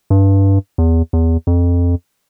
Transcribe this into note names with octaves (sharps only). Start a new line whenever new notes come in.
G2
E2
E2
F2